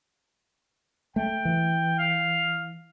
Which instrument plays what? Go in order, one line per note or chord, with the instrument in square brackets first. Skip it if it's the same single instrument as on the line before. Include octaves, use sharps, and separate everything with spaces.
[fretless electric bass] A3 [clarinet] G5
[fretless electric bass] E3
[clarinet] F5